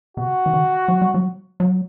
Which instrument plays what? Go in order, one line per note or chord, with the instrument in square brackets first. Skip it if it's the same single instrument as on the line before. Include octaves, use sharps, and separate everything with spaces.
[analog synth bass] C3 [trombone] F#4
[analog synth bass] E3
D#3
F#3
G3
F#3
F#3